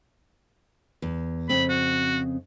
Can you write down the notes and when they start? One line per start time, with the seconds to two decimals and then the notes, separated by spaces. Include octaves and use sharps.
1.02 E2
1.49 F2 C#3 C4 B5
1.69 F#4